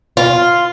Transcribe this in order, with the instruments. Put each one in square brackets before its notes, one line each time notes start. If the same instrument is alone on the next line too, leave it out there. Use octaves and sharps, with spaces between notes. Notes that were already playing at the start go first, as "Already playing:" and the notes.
[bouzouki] F4